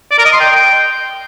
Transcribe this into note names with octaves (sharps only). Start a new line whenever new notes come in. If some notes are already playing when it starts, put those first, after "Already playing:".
D5
A#4
D#5
C6
G5